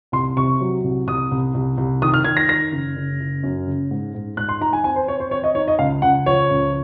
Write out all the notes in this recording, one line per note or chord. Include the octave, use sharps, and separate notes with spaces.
C2 C6
C3 C#6
F#3
C2
C2 D#6
C2
C2
C2
D#3 D#6
F6
D#3 G#6
A#6
D#3 A#6
F#1
F#1
F#1
F#2
F#1
G#2
G#2
G#2 F#6
C6
D#4 A#5
G#5
C4 G#5
C5
C4 C#5
C5
C4 C#5
D#5
D#4 C#5
D#5
C#2 F5
C#2 F#5
F3 C#5
C#2